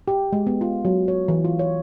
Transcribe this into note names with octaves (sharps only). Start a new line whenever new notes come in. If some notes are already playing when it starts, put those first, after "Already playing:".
G4
G#3
B3
F4
F#3
C#5
E3
F4
C#5